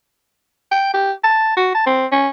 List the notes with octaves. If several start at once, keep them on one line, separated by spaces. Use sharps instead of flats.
G5
G4
A5
F#4
A5
C4
C#4